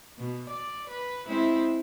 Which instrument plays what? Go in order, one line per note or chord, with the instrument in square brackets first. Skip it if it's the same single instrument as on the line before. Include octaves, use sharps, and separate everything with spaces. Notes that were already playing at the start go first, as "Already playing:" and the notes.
[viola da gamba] B2
D5
B4
G#3 C4 E4